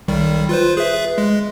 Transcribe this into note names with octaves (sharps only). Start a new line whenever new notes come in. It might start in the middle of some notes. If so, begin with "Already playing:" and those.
B1 D#3 G3
F4 B4 C5
G#4 B4 E5
G#3